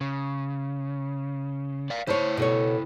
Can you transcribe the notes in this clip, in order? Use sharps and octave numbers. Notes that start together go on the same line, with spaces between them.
C#3
D5 F5
C#3 E4 C5 C#5 A5
B2 A4 C#5